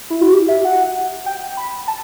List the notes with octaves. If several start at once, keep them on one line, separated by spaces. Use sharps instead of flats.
E4
F#4
G4
E5
F#5
G5
B5
A5